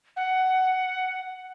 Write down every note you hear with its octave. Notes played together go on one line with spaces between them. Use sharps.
F#5